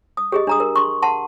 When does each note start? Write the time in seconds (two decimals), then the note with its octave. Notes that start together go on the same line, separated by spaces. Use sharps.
0.17 D#6
0.32 G4 G#4 D#5
0.47 D4 A#5 D#6
0.60 A#4
0.76 C6 C#6
1.02 F#5 A5 C6